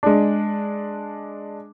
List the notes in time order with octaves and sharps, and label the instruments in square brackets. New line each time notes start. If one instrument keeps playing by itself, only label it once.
[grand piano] G#3 D4